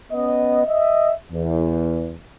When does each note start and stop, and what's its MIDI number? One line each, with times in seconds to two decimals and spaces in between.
0.12 0.62 59
0.12 0.62 61
0.12 0.62 75
0.67 1.12 75
0.67 1.12 76
1.31 2.14 40